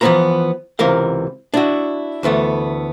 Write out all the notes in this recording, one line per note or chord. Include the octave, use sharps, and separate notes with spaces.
E3 F3 B3 C4 B4 A#5
C#2 C3 E3 A#4 F5
D4 E4 F#4
D2 E3 A3 B3